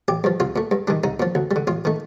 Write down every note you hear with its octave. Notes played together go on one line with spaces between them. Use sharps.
A1 G4
G2 F3
C2 F4
A#2 A3
G2
D#3 G3 D4
C2 D#4
A#2 F3
D2
G3
D3
A1 F4
D#3 A3